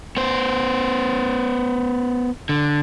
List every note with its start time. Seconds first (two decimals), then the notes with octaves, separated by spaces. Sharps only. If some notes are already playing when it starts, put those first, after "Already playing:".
0.17 B3 C5
2.49 D3